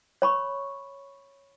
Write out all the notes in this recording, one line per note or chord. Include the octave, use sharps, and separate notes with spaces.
C#5 B5 C#6